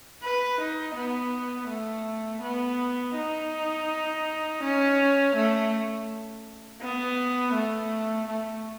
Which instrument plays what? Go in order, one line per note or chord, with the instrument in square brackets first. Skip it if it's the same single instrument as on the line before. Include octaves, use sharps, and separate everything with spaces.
[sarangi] B4
D#4
B3
A3
B3
D#4
C#4
A3
B3
A3
A3